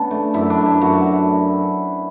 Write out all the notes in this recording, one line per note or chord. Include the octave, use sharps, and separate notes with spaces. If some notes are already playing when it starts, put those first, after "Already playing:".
Already playing: C#3 B3 D4
A3
F#2 E4
D4
A3
E4
F#2 F#4
F#4